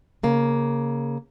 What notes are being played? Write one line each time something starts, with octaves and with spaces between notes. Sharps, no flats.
C#3 A#3